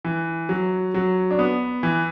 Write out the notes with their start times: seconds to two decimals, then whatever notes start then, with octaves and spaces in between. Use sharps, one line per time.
0.05 E3
0.49 F#3
0.94 F#3
1.31 D4
1.39 B3
1.83 E3